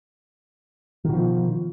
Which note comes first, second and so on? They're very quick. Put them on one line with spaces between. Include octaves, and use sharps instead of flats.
D#3 B2 F3